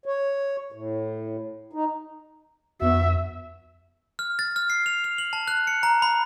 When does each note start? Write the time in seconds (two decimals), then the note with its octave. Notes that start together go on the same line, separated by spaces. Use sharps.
0.06 C#5
0.72 A2
1.73 D#4
2.82 F2 B3 F#4 E5
4.19 F6
4.39 A6
4.56 F6
4.70 C7
4.86 F7
5.04 F7
5.18 F#7
5.33 A5
5.48 F#6
5.67 C#7
5.83 A#5
6.02 B5